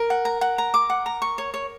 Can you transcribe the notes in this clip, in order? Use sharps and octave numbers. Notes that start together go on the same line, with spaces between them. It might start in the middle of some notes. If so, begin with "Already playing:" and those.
Already playing: A#4
F#5
A#5
F#5
A#5
D6
F#5
A#5
C#6
C#5
C#5